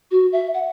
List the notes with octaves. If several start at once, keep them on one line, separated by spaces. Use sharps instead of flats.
F#4
E5
F#5